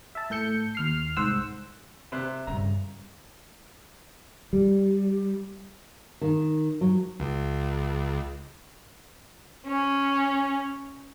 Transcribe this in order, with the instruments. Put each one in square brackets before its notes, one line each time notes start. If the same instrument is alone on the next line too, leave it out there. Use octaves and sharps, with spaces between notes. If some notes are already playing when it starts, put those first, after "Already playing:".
[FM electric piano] E5 A5
A2 A4 G6 C#7
D#2 F6 C7
C2 G#2 C5 F#5 E6
[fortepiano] C3 C5 F#6
[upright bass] G2 C#3 [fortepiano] A#5
[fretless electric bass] G3
[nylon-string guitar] D#3
F#3
[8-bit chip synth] C#2
[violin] C#4